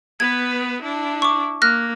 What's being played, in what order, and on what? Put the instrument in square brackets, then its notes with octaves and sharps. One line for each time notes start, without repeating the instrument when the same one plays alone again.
[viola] B3 B4 [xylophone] G#6
[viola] D4 E4
[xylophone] C#6 D6
[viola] A#3 [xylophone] F6 F#6 A#6